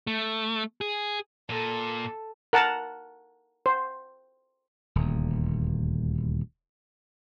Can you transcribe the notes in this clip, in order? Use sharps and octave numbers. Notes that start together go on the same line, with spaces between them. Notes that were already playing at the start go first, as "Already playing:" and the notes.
A3
G#4
A#2 A4
A#4 F#5 A5
C5
D#1 D2